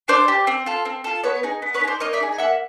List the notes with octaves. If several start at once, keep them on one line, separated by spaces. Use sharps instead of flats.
D4 C5 D5
G4
C4
F4 A4
C4
F4 A4
B3 B4 C#5
D#4 G#4
B3
B4 C#5
D#4 G#4
C5 D5
A#3 C#5 D#5
D5 E5
D#4 G#4
A#3 E5 F#5